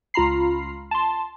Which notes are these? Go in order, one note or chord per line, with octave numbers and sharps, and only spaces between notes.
C#2 F4 A#5 B5 C7
A5 C6